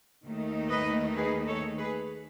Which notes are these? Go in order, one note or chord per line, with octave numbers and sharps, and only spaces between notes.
D#2 D#3 A3 D#4
B4 D#5
G#4 B4
A4 C#5
G#4 B4